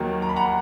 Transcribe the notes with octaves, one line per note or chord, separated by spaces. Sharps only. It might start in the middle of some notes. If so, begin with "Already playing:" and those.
Already playing: D#2 D#3 F#3 A#3
A#5
B5
F#5 A#5